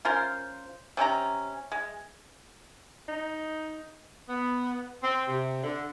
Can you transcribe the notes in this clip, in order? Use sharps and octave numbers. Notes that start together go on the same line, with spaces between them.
C#4 F4 A#4 C5
C3 C#4 D#4 A#5
G#3
D#4
B3
C4
C3
D3